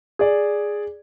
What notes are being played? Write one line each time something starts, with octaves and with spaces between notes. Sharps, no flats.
G#4 D5